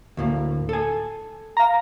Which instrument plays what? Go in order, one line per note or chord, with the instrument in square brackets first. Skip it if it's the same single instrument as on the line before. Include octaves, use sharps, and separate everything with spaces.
[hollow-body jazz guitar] D2 A2 A#3
A4 G#5
[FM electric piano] F5 A#5